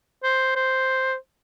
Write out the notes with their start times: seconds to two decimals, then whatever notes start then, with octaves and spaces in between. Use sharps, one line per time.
0.24 C5
0.56 C5